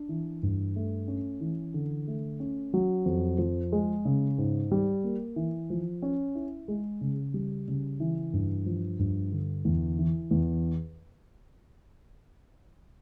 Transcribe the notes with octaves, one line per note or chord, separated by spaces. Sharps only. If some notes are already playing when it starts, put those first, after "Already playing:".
Already playing: D4
E3
G2
A3
C#4
E3
D3
A3
C#4
F#3
F2
F3
G#3
C#3
G#2
G3
A#3
E3
F3
C#4
E4
G#3
C#3
G3
C#3
E3
G2
F3
G2
D3
E2
E3
E2